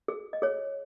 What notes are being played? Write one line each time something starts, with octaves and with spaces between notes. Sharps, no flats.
G#4
D#5
G#4 C#5